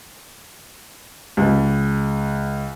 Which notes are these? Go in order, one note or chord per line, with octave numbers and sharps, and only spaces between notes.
C#2